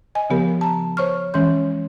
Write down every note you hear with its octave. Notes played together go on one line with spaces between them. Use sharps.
D#5 G#5
C#3 F3 B3 G4 A#4
A5 A#5
C5 C#5 C#6 F6
E3 G#3 C#4 C#5 C6 G6